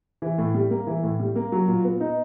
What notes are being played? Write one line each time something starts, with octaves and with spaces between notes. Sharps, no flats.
E3
A2
G3
A#3
E3
A2
G3
A#3
F#3
A#2
B3
D#4